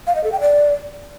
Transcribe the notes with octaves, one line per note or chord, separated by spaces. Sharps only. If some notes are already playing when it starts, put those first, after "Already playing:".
F5
D#5
A4
G5
D5